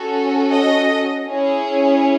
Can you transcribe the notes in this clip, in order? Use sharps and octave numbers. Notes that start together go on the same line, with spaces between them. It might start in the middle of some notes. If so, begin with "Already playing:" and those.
Already playing: C#4 F#4 A4
D#5
C#4 E4 G#4